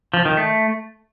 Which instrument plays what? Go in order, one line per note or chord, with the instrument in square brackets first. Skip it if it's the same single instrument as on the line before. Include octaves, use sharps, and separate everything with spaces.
[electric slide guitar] F3
D#3
A3